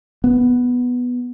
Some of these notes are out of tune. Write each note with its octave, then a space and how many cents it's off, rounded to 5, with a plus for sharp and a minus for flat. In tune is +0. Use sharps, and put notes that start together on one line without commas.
B3 +0